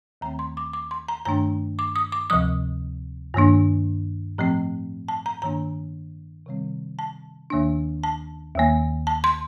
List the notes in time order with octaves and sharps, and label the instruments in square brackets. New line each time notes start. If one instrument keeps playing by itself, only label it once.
[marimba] D#2 D#3 A3 C4 A#5
C6
D6
D6
C6
A#5
G2 D#3 A3 D4 A#5
D6
D#6
D6
D2 C3 F3 D#6
G2 D#3 A#3 D4
A2 F3 A3 C4
A5
A#5
G2 D#3 A#3 D4 A#5
C3 D#3 G3 C4
A5
D#2 D#3 A#3 D4
A5
D#2 D#3 A#3
A5
C6